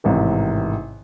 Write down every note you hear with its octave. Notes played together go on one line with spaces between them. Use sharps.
A1 G#2 C3 D#3